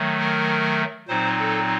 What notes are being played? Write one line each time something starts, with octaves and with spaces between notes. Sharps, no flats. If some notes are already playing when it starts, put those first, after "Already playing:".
Already playing: D#3 F#3 A3
A#4
A#2 F#3 C4 D#4 C5
A4